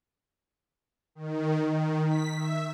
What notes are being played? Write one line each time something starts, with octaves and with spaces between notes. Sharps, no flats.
D#3
D#3
B6
E5